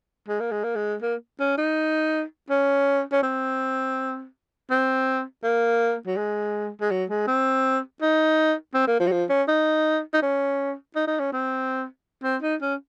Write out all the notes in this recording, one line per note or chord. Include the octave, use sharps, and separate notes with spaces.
G#3
A#3
G#3
A#3
G#3
A#3
C#4
D#4
C#4
C#4
C4
C4
A#3
F#3
G#3
G#3
F#3
G#3
C4
D#4
C4
A#3
F3
F#3
F3
C#4
D#4
D#4
C#4
D#4
D#4
C#4
C4
C4
D#4
C#4